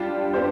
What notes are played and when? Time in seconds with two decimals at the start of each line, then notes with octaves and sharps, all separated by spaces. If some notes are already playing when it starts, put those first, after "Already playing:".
Already playing: G3 D4 F4
0.33 B3 D4 G4 C5